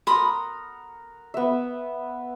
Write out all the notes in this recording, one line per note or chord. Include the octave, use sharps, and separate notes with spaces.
A#4 F#5 B5 C6 D#6
B3 E5